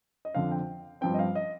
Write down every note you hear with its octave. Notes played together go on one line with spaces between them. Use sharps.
D#5
F2 D3 F3 C4 F5
G5
G2 F3 C4 G5
D#5
F5
D#5